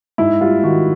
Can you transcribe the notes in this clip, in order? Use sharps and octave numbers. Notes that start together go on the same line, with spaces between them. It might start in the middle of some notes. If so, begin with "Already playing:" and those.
G#2 E4
G3 F4
D#3 F#4